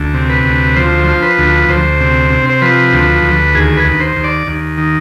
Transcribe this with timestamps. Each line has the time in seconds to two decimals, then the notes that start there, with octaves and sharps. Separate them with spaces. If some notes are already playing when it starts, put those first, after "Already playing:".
Already playing: D2
0.14 C3
0.29 B4
0.45 D2
0.76 F3 C5
1.08 F3
1.22 B4
1.38 D2
1.69 D2 C5
2.00 C3
2.30 C3
2.50 C5
2.62 F3 B4
2.93 D2
3.23 D2
3.55 D#2 G#4
3.77 B4
3.85 D#2
4.00 C5
4.16 D#2
4.24 D5
4.47 D#2
4.78 D#3